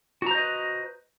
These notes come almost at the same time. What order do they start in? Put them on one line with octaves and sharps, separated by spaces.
F#4 A#5 C5 D#5 B4